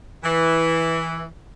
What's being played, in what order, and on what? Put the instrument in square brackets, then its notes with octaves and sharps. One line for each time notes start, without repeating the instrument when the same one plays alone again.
[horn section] E3